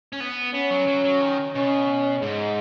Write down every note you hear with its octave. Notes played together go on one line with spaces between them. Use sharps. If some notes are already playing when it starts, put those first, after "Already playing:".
C#4
B3
B3 C#4
F#3
F#3
F#3
D#3
B2 C#4
G#2 G#3